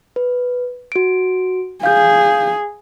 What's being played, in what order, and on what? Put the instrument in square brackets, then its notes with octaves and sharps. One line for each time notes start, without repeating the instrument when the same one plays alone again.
[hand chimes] B4
F#4 D7
[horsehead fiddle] G#4 [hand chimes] F5 G6